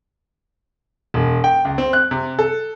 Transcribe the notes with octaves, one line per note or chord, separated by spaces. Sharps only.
E1
G5
C#2
C4
F#6
C3
A4